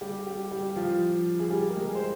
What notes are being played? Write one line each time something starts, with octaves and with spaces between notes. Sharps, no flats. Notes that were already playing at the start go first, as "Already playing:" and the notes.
G3 G4
G3 G4
G3 G4
F3 F4
G#4
G3 G4
A#4
G#3 G#4
C5